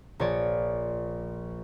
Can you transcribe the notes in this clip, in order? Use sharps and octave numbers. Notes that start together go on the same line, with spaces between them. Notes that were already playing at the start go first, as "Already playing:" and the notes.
A#1 F3 C#5 D5